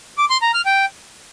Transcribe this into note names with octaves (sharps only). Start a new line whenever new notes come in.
D6
C6
A#5
F6
G5